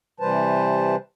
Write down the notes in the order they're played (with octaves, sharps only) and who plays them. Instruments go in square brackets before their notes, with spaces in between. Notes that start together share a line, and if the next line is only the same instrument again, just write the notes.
[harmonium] C3 E3 G3 B4 C5 A5